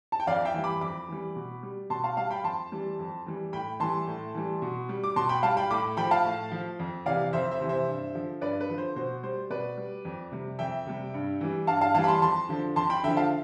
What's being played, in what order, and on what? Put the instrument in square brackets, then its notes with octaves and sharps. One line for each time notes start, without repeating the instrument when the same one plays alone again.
[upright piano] A5
G5
F2 D5 F5
E5 G5
E3 G3
B5 D6
F2 B5 D6
E3 G3
B2
G3
B2 A5 C6
F5 A5
G3 F5 A5
G5 B5
F2 A5 C6
E3 G3
F2
E3 G3
A2 G5 B5
E3 G3 A5 C6
A2
E3 G3
B2
G3
D6
B2 A5 C6
G5 B5
G3 F5 A5
G5 B5
A2 B5 D6
F3 G5 B5
F5 A5
A2
F3
F2
C3 E3 D5 F5
F2 C5 E5
C5 E5
C3 E3
C5 E5
G2
D3 F3
G2 B4 D5
B4
D3 F3
C5
B2 C5
G3 C5
B2 B4 D5
G3
F2
C3 G3
F2 E5 G5
C3 G3
G2
E3 G3
G2 F5 A5
F5 A5
E3 G3 F5 A5
B5
A5 C6
F2 A5 C6
D3 F3
F2 A5 C6
G5 B5
D3 F3 E5 G5
F5 A5